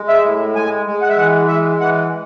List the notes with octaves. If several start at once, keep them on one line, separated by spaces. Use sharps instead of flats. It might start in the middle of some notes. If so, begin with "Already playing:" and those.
Already playing: G#3
E5
A2
G#3 G#5
G#3
F#5
E5
E3 F#5
G#3 E5
E3 F#5